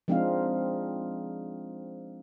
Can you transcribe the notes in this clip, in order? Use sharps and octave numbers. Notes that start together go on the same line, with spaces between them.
F3 G#3 C4 D4 D#4 F5